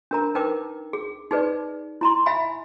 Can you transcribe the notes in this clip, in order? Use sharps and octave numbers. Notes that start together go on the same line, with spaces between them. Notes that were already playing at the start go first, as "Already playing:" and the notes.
D4 A#4 A#5
D#4 A#4 B4 G5 D6
G#4
D#4 G#4 B4 D5
E4 A#5 C6
E5 F5 G#5 B5